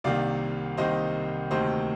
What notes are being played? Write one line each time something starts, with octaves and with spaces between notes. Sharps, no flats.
C2 C3 D#3 A#3 D5 F5
C2 C3 D#3 A#3 C5 D#5
D2 C3 D#3 A#3 C5 D#5